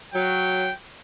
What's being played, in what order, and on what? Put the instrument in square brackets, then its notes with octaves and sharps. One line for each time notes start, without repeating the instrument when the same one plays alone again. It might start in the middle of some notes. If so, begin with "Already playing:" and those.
[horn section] F#3 [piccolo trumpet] G5